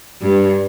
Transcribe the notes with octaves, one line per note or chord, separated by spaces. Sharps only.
G2